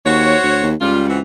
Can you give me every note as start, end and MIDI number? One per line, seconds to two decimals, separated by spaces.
0.05 0.36 39
0.05 0.68 66
0.05 0.68 72
0.05 0.68 73
0.43 0.63 38
0.63 0.75 39
0.80 1.21 37
0.80 1.03 55
0.80 1.03 65
1.07 1.17 52
1.07 1.17 60
1.07 1.17 66